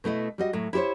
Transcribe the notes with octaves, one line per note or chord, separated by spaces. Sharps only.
B2 A3 E4 D#5
G3 F#4 D#5
A2 F#3
E4 G4 G#4 C5 C#5